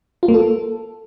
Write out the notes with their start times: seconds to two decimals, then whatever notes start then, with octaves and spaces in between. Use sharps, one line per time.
0.23 F4
0.28 A#3
0.34 A4